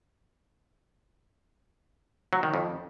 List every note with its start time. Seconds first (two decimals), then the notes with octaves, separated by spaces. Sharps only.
2.33 F#3
2.43 D#3
2.54 F2